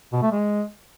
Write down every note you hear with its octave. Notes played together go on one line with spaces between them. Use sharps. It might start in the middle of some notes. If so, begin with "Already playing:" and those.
B2
A3
G#3